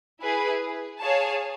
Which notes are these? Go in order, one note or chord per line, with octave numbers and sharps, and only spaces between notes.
E4 G#4 B4
G#4 C#5 F5 A5